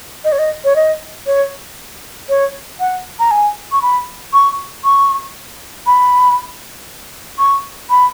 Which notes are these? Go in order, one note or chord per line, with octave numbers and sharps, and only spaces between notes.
D#5
C#5
D#5
C#5
D#5
C#5
C#5
F#5
A#5
G#5
C#6
B5
C#6
C#6
B5
C#6
B5